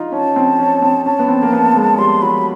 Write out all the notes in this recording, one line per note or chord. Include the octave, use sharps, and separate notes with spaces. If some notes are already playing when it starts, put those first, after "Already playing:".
Already playing: D#4 F4
C#4 A5
C4
C#4
C4
C#4 A5
B3
C4
A#3
B3
G#3
G3 C6
F#3 B5